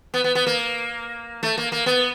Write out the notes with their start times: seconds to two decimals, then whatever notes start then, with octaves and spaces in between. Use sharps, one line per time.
0.14 B3
0.24 B3
0.35 B3
0.46 A#3
1.43 A3
1.58 A#3
1.72 A#3
1.86 B3